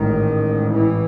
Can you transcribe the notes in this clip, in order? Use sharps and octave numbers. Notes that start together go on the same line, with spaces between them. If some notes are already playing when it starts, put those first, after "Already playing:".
Already playing: A1 G#2 D#3
E3